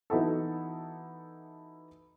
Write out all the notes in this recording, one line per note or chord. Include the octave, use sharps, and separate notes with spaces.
E3 B3 D#4 E4 F#4 A4